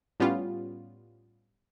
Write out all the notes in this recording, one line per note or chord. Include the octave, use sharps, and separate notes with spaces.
A2 G3 B3 C#4 F4